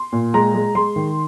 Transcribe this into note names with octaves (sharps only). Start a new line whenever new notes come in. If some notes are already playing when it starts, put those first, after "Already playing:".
Already playing: C6
A#2
G#3 A#5
G#3
G#3 C6
D#3